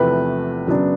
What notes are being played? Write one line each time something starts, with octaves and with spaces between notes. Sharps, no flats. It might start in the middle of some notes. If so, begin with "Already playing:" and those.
Already playing: E2 C3 F3 A3 B4
F#2 C#3 F#3 B3 D4